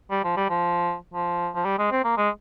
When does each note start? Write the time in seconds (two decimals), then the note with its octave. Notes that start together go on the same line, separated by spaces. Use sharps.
0.11 G3
0.24 F3
0.37 G3
0.50 F3
1.14 F3
1.55 F3
1.65 G3
1.79 G#3
1.92 C4
2.05 A#3
2.17 G#3